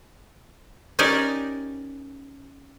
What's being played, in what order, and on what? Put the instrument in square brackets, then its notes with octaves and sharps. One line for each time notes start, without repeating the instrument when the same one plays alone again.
[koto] C#4 D#4 G4 A#4 D5